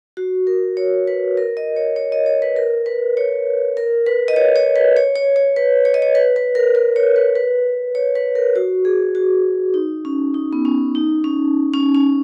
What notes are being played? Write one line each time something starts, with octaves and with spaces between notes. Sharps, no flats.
F#4
A#4
C#5
B4
A#4
D#5
C#5
C#5
D#5
C#5
B4
A#4
B4
C#5
A#4
B4
D#5
C#5
C#5
B4
C#5
C#5
C#5
B4
C#5
D#5
C#5
B4
B4
A#4
A#4
C#5
B4
B4
C#5
B4
A#4
F#4
G#4
F#4
D#4
C#4
D#4
B3
C#4
D#4
C#4
C#4
C#4